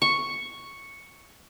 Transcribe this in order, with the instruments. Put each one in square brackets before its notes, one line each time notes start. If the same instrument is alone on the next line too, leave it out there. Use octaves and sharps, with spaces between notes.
[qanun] C#6